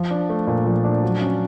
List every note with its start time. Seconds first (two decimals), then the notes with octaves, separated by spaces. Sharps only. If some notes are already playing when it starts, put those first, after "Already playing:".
Already playing: F3
0.11 D4
0.29 A3
0.47 A#2
0.66 F3
0.84 D4
1.03 F#3
1.21 C#4